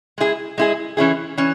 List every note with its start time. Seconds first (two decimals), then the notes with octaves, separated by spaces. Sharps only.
0.18 G#3 E4 G#4
0.58 G#3 E4 G#4
0.97 E3 C#4 E4 G#4
1.38 E3 C#4